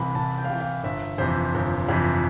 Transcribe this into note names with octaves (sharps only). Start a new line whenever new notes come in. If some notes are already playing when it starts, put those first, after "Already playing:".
Already playing: C2 C3 E3 B5
C2 A5
G5
F5
C3 E3 G5
F5
G1 E5
F2 C3 E3 C5
G1
F2 C3 E3